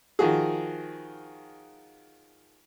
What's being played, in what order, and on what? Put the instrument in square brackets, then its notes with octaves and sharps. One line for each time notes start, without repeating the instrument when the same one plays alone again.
[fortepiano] D#3 F3 F#4 G#4